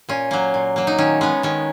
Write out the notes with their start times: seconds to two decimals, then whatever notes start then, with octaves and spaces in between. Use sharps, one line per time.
0.09 A#2 C#4
0.31 F#3 A#3
0.54 A#2
0.76 F#3 A#3
0.87 D#4
0.98 D#3 C#4
1.21 G#3 B3 C#4
1.43 D#3 C#4